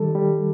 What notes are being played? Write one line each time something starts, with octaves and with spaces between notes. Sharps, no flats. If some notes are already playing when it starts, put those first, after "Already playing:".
Already playing: D#3 G3 A4
G3